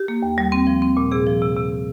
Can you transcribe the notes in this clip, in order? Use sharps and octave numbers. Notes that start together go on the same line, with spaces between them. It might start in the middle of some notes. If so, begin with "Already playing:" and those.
Already playing: G4
A#3
D#2
G3
C4
F3
C4
A#2
C3 G#4
F3
C3
C3